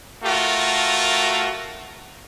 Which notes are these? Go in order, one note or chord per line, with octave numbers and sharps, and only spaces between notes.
A3 F4 F#4 A#4